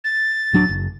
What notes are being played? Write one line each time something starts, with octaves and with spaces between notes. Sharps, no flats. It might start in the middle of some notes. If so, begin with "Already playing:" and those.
A6
D1 F#3 D4
F#1